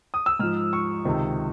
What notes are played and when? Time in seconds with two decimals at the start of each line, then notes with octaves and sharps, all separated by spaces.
0.14 D#6
0.26 E6
0.39 G#2 F3 F6
0.73 C#6
1.05 C#2 C3 D#3